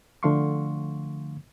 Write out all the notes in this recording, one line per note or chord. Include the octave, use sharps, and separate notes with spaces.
D3 F3 A3 F5 C6 C#6